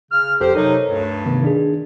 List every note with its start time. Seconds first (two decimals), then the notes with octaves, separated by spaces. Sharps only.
0.12 C#3 F6
0.40 G1 F2 G4 A4 C5
0.55 C3 F#3 D#4 A4 A#4 C#5
0.88 D2 G2
1.25 C3 D#3 B3
1.42 D#3 D4 G#4